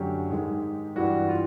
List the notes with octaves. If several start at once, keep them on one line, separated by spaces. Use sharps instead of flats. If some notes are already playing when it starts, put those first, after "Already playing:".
Already playing: F#2 D3 F#3 A3 G4
G#2 D#3 G#3
G2 E3 G3 F#4
F4